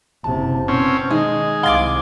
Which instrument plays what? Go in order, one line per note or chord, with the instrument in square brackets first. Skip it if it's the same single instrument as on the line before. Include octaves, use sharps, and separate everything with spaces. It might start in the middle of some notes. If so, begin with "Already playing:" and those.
[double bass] F#1 C3 [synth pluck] A5
[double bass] B2 [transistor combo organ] C4 C#4
[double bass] D#3 [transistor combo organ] G#3 [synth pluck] D#4 D#5
[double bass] C2 [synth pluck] F5 G#6 [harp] C6 D6